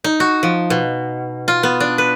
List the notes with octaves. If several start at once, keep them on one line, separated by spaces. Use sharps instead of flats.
D#4
F#4
F3
B2
F4
B3
D4
B4